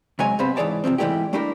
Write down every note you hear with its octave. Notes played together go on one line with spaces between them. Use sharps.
C3 F#3 G#3 C#5 G#5 A#5
G2 C3 B3 C4 C5 B5
G#2 E3 G#4 C#5 D5 A5
C3 D#3 F3 C4
G#2 E3 G3 A3 E4 G4
G3 A3 D4 E4 G4 A#4